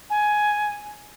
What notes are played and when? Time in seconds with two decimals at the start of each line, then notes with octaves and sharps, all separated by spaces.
0.10 G#5